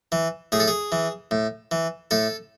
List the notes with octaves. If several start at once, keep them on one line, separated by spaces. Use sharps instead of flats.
E3
A2 G#4
A4
G#4
E3
A2
E3
A2 A4